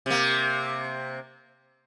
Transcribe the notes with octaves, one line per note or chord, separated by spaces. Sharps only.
C3 A#3